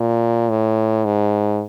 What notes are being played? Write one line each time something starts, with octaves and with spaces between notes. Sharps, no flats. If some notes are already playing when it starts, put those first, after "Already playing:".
Already playing: A#2
A2
G#2